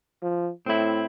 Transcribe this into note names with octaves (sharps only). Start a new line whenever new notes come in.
F3
A2 C4 E4